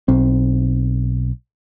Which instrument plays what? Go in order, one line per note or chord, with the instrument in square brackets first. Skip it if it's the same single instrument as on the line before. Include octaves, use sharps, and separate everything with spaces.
[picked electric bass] B1 C4